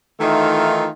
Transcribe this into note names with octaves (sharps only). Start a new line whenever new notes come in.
D#3 E3 A3 D#4 F4